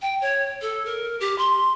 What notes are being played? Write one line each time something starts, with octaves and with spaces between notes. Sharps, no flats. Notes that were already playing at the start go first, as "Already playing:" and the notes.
G5
C#5
A4
A#4
G4
C6